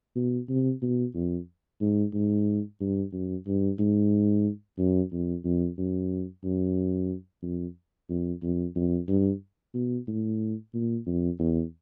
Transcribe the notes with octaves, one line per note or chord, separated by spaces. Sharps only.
B2
C3
B2
F2
G#2
G#2
G2
F#2
G2
G#2
F#2
F2
F2
F#2
F#2
F2
F2
F2
F2
G2
B2
A2
A#2
F2
E2